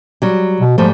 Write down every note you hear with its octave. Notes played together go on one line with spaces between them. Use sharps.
F#3 G3
B2
G#2 F3 G3 A3